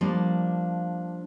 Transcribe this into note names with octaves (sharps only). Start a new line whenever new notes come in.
F3 G3 A#3 D4